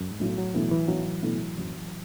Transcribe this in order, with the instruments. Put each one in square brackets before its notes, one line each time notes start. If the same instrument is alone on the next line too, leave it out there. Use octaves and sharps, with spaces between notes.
[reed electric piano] F#2
G#2
[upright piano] B1 [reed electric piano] A2
[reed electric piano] F#3
[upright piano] B2 A3 E4 [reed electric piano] E3
[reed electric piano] E3
[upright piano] B1 [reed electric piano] F#3
[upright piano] B2 A3 E4
F#1